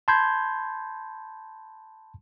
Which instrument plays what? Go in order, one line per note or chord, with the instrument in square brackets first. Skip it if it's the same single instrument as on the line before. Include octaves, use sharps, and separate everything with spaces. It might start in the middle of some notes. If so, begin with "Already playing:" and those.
[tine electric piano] A5 B5 C6 G6 G#6